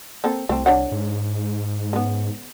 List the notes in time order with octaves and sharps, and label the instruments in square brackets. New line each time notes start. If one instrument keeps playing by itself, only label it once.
[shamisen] A#3 C4 A4
[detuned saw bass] C2 [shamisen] A3 C4
[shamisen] D4 C#5 F#5
[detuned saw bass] G#2
[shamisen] C#3 B3